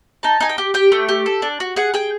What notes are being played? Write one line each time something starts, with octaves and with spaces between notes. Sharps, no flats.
D#4 A5
D#4 G#5
G5
G4
G4 G5
A3
G4
A4
D4
F#4
G#4 F#5
G#4 G5